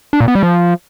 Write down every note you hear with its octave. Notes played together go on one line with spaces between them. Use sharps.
D4
A#2
B3
G3
F3